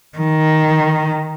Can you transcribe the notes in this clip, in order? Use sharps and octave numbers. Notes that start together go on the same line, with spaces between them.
D#3